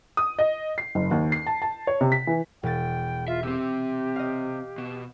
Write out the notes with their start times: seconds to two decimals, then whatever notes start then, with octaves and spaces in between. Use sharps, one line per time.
0.17 D#6
0.39 D#5
0.78 C7
0.95 F#1
1.11 D#2
1.32 C7
1.47 A5
1.62 A5
1.87 C#5
2.01 C3
2.12 B6
2.27 E3
2.63 E1 G5 A6
3.28 F4 E5
3.43 C3 C4 G4 E6 D#7
4.16 D#5 F5
4.78 B2 E7